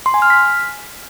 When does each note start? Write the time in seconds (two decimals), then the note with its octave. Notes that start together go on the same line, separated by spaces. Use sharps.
0.06 C6
0.14 G#5
0.22 F6
0.30 B6